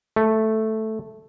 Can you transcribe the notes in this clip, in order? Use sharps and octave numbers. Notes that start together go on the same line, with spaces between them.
A3